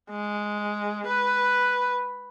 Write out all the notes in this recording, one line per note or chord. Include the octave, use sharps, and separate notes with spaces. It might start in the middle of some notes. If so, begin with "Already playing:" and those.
G#3
B4